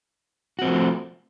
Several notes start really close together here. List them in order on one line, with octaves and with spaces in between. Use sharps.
F#4 C4 F3 A3